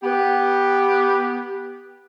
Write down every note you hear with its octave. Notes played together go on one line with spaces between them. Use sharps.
B3 G4